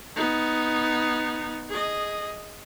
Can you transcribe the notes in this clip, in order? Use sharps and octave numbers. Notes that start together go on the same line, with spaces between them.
B3 D#4
G#4 D#5